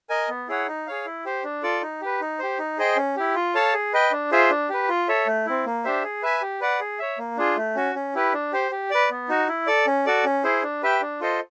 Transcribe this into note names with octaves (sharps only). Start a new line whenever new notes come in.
A#4 D#5 G#5
B3
E4 G#4 C#5 F#5
D#4
G#4 C#5 F5
E4
G4 C5
D4
F4 A4 D5
D#4
G4 B4
D#4
G4 C5
D#4
G#4 C5 D#5 G5
C#4
E4 G4
F4
A4 C#5 F5 A5
G#4
B4 D#5 G5
D4
F4 G#4 C5 E5
D4
G4 B4
F4
A4 C#5 E5
A3
C4 E4
A#3
D4 G4 C5 E5
G#4
B4 E5 G#5
G4
B4 D5 F#5
G#4
C#5 E5
A#3
D4 F4 G#4
A3
C#4 F#4
C#4
E4 G4 B4
D4
G4 C5
G4
B4 D5
B3
D#4 F#4
E4
A4 D5
C#4
F#4 A4 D5
C#4
E4 G#4 C5
D4
G4 B4 E5 G5
D4
F4 A4 C5 D#5